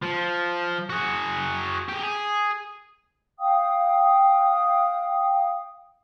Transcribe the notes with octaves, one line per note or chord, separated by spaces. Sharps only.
F3
F#4 G#4
G4 G#4
G#4
F5 G5 D#6